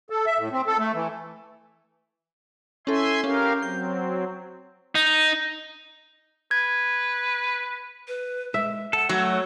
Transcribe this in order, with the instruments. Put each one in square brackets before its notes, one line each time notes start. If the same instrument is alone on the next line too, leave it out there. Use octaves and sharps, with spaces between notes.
[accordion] A4
E5
A2
C4
A4
A3
E3
[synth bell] C#4 E4 A4 [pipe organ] E5 G#5 C6
[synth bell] C#4 [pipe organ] G4 A#4 F5
[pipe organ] F#3 C4 [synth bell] G6
[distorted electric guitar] D#4
[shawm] B4 [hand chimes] G#6
[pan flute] B4
[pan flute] G#3 [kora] E5
[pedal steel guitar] A4 [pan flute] F#5
[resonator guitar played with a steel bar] F#3 [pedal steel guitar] A3
[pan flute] C#5